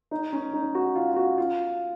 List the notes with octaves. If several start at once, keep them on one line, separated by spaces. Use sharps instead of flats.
D#4
C#4
D#4
F#4
F4
F4
F#4
F4